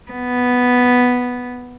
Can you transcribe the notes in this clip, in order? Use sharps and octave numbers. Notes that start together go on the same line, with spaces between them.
B3